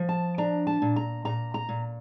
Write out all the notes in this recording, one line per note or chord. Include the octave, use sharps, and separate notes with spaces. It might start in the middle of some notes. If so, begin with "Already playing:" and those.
Already playing: F3
A5
D4 A#5
A5
A#2
A#5
A#2 A#5
A#5
A#2